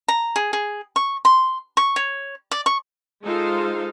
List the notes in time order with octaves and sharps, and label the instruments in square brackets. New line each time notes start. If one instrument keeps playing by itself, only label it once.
[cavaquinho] A#5
G#4
G#4
C#6
C6
C#6
C#5
D5
C#6
[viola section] G#3 D#4 F4 A4 C5 F5